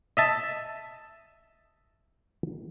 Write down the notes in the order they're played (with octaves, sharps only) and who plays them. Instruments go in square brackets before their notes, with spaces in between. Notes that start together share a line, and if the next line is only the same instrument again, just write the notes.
[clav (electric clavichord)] D#5 E5 A5